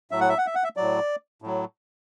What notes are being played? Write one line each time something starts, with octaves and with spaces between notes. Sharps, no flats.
A2 F#3 E5
F#5
E5
F#5
E5
F#5
E5
A2 F#3 D5
A2 F#3